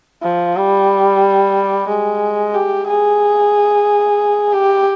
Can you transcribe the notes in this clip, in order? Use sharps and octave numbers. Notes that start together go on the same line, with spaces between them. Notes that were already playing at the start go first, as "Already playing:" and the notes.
F3
G3
G#3
G4
G#4
G4